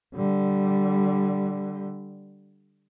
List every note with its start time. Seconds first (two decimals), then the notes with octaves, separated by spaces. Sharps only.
0.15 D3 G3